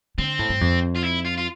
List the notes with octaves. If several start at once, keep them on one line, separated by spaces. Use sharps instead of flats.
D3 C4
A2
G2
F2
F4
E4
F4
F4